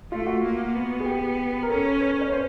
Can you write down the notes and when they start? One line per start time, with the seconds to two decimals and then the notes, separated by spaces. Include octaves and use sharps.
0.11 A3 F4
0.27 F#4
0.44 A#3
0.75 B3
1.00 G#4
1.05 G4
1.63 A#4
1.69 C#4 A4
2.00 B4
2.21 C#5
2.32 C5